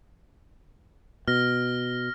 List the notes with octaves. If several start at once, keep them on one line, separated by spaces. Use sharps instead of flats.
B2 F6 A#6